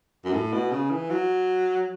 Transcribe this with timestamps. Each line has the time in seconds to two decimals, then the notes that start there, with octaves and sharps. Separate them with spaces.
0.25 F#2
0.33 A2
0.53 B2
0.72 C#3
0.90 E3
1.10 F#3